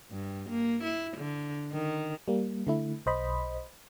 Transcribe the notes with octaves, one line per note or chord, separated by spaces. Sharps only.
G2
A#3
E4
D3
D#3
G3 A#3
D3 A3 E4
B1 C5 D#5 B5